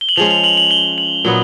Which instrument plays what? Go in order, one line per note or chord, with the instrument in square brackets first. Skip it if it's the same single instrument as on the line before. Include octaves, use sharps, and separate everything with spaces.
[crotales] G7
F#7
[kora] F3 G#3 C#4 [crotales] F7
[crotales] F7
F#7
F#7
G7
F#7
[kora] A#2 F#3 B3 D#4